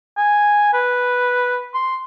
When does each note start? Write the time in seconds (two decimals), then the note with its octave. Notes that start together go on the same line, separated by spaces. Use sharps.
0.17 G#5
0.73 B4
1.74 C6